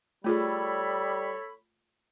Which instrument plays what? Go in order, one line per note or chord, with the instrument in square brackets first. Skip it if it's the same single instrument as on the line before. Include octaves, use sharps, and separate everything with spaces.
[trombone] G3 [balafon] A3 F4 G#4 [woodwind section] A4 C#5 B5